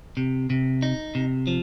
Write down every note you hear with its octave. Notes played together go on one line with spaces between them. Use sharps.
C3
C3
D#4
C3
F3